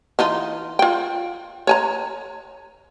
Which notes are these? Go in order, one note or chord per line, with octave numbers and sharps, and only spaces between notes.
E3 D#4 F4
F4 G5
C#5 G#5 A#5